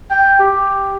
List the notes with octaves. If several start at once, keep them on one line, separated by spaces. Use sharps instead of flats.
G5
G4